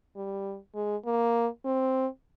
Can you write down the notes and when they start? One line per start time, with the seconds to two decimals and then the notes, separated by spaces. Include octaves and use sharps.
0.16 G3
0.75 G#3
1.06 A#3
1.65 C4